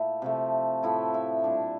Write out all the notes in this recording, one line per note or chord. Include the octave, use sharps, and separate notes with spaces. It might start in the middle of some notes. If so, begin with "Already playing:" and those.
Already playing: A#2 A3 E4
C3 F3 A3
A2 F3 A3 E4
E4
A#2 G3 D4